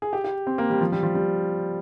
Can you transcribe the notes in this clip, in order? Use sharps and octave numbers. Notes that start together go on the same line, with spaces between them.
G#4
G4
G4
C4
A#3
G3
F3
G3
F3
G3